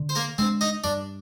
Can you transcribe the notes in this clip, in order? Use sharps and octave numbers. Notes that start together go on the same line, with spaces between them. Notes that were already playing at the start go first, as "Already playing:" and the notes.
Already playing: D3
C5
A#3 A#4
G#3 C4 D4 C5
D#4 D#5
G2 D4 D5